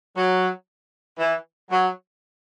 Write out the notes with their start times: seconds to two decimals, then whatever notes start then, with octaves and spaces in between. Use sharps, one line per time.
0.17 F#3
1.19 E3
1.71 F#3